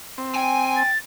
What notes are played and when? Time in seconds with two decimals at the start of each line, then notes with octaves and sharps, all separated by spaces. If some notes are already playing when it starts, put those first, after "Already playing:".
0.18 C4
0.35 G5 G#5
0.77 A6